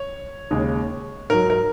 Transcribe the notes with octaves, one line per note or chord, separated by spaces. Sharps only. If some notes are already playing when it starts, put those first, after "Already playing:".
Already playing: C#5
D#2 C#3 G#3
G#2 F#3 A#4
A#4